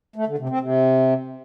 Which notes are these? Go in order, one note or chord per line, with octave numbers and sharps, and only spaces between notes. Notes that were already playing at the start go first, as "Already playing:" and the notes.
A3
D3
C3
C4
C3